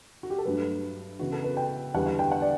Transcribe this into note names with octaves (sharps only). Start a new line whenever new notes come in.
F#4
G4
A4
G2 F#3 A3 B4
C#3 E3 B3 F#4
A4
B4
G5
E2 D3 G3 B3 F#5
F#5
G5
F#5
D5